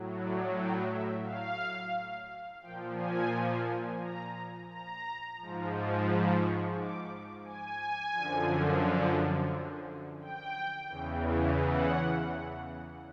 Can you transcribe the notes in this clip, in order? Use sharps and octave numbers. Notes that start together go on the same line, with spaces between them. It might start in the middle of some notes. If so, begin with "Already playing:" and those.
Already playing: A2 F#3
D5
G5
E5
F5
A#2 F3 G5
G#5
A#5
A#5
G#2 F3
B5
C#6
D6
G#5
F#2 D3 F3
G5
E2 C#3 E3
F#5